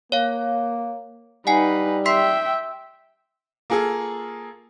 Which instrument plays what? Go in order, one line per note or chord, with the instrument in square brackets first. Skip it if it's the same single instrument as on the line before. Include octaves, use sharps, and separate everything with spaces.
[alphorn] A#3 [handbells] C#5 F5
[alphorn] G3 [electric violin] D#4 B4 [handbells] F#5 G#5 C7
[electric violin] E5 G5 [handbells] C6 B6 C7
[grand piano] A#3 F4 G#4 A4